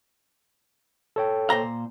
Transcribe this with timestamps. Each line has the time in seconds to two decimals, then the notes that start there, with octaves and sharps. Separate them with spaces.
1.16 A4 C#5 G5
1.50 A#2 C5 A#5